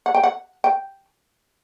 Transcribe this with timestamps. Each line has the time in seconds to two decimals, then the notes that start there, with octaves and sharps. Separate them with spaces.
0.06 F#5
0.15 G5
0.24 F#5
0.64 G5